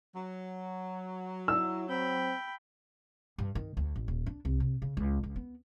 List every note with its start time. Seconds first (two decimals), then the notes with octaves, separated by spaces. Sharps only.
0.15 F#3
1.48 E4 E6
1.89 C4 G5 B5
3.38 G2
3.55 D#3
3.77 D2
3.96 A1
4.08 D#1
4.26 D4
4.45 C2
4.60 C3
4.82 C#3
4.97 C#2
5.23 C#2
5.36 B3